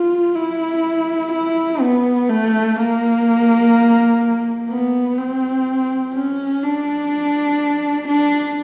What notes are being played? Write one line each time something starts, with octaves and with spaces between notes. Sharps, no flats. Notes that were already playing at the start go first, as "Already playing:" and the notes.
Already playing: F4
E4
E4
B3
A3
A#3
B3
C4
C#4
D4
D4